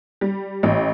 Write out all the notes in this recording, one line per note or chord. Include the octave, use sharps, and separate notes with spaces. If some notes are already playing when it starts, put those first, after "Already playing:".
G3
A1